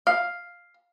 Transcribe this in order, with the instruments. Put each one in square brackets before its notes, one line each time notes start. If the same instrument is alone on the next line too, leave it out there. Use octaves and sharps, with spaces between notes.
[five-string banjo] F5